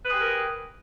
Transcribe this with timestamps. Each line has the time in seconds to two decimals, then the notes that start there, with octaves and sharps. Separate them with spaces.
0.04 B4
0.09 G#4
0.13 G4
0.18 A#4